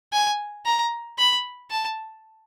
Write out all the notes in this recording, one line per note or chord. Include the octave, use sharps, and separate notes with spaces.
G#5
A#5
B5
A5